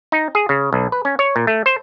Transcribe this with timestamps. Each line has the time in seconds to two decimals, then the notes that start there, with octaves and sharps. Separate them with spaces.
0.12 D#4
0.35 G#4
0.49 C#3
0.73 B1
0.92 B4
1.05 C#4
1.19 C#5
1.36 A#2
1.47 A3
1.66 C5